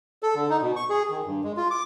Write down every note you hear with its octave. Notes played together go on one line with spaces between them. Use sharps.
A4
D3
D#4
B2
C#6
G#4
D#3
G2
G#3
F4
D6